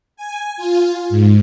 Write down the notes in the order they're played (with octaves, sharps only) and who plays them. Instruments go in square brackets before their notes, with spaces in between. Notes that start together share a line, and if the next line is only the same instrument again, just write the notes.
[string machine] G#5
F4
G#2